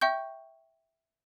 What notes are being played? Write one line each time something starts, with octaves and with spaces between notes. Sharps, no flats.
E5 G5 C#6 G6